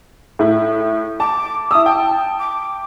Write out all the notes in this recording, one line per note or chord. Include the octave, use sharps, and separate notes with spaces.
A2 E4
A5 D6
E4 D#6 E6
G5 A5
D6